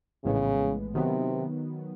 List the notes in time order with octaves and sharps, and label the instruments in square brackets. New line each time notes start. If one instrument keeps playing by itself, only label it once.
[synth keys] A#1 A2 E3 G#3 B3 [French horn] C#3
[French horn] C3 [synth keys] D#3 F#3 B3